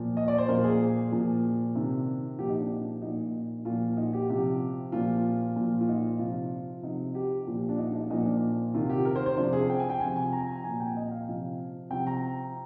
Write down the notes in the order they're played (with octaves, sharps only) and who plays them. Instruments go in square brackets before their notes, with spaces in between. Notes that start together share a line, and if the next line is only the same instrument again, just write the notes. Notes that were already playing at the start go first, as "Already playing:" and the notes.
Already playing: [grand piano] A#2 F3
D#5
D5
C5
A#2 F3 A#4
G#4
A#2 F3
C3 D#3
A#2 F3 G4
D#4
D4
D#4
A#2 F3 D#4
A#2 F3 F4
D#4
G4
C3 F3 G4
A#2 F3 F4
A#2 F3
F4
D#4
C3 F3 F4
C3 F3 D#4
G4
A#2 F3 F4
D4
D#4
D#4
A#2 F3 D#4
D4
C3 D#3 F4
G4
A#4
C5
C5
C3 F3 D4
G#4
G5
G#5
G5
C3 F3 G#5
G#5
A#5
A#2 F3 G#5
G5
D#5
F5
C3 F3
C3 F3 G5
A#5